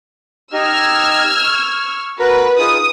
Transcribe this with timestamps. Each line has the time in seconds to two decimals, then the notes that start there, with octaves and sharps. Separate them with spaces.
0.53 D#4 G4 D#5 E6 F6 G#6
1.43 C#6
2.19 F#4 A#4 B4 A#5
2.59 D#4 F4 G#4 D#6